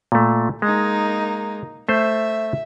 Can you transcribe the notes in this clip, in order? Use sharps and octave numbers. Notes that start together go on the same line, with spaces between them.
A#2 A3
G#3 A#3 D#4
A3 C5 E5